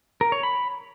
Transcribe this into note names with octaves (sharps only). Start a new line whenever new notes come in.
A#4
C#5
B5